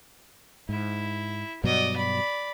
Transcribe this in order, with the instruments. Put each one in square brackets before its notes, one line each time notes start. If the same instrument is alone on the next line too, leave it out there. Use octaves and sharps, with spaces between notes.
[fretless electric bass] G#2 [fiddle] E4
[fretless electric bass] G2 B2 F#3 [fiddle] D5 D#5
[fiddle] D5 B5